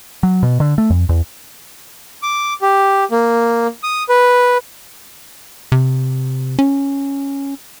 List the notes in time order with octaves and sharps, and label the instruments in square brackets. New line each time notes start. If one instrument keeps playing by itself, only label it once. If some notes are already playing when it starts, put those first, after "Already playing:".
[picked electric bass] F#3
B2
D3
A3
F2
E2
[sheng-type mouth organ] D6
G4
A#3
D#6
B4
[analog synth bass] C3
C#4